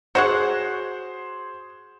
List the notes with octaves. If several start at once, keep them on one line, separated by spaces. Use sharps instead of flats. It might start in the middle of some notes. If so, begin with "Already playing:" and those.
F#4 G#4 C5 C#5 F#5